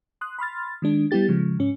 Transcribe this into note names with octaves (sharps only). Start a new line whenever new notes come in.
C6 D#6 F#6
B5 C6 F6 A6
D#3 G#3 D4
G3 B3 E4 G4 A6
C#3 F3 G#3
G#2 C#4